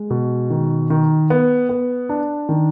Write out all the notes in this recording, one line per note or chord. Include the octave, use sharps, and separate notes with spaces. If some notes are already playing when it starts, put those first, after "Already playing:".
Already playing: G#3
B2
D#3
D#3
B3
B3
D4
D#3